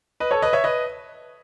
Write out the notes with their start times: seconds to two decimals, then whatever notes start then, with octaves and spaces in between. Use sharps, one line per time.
0.20 B4 D#5
0.31 A4 C#5
0.42 B4 D#5
0.53 C#5 E5
0.64 B4 D#5